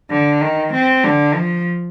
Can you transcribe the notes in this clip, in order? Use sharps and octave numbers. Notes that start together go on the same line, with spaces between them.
D3
D#3
C4
D3
F3